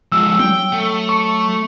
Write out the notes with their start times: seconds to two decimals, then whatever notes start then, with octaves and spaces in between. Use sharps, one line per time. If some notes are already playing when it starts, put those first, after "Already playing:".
0.12 F3 G#3 E6
0.39 F#3 G5
0.73 A3
1.09 C#6